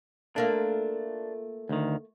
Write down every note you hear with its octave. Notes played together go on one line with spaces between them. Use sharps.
A3 A#3 D4 F4
D2 D#3